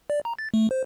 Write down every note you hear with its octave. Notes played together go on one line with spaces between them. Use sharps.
D5
A#5
A6
A3
C5